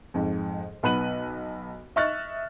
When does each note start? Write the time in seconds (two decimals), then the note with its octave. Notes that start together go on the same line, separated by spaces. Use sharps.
0.14 F2 G#2
0.83 B1 B3 B5 F#6 D#7 F#7
1.96 D#5 E5 C#6 F6 F#6 A6